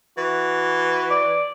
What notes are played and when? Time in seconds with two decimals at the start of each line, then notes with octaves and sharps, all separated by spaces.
0.17 E3 F#4
1.10 D5